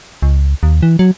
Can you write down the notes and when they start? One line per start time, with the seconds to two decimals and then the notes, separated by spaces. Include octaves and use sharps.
0.22 C#2
0.63 D#2
0.83 E3
0.99 F#3